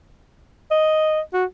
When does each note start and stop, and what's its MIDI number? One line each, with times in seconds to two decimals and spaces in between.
0.71 1.21 75
1.34 1.45 66